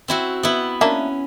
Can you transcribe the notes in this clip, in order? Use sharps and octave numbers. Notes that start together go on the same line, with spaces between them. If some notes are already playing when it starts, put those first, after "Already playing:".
C4 E4 F#4
B3 E4
A#3 C#4 D4 E5